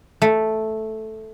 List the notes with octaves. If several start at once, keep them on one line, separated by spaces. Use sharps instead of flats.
A3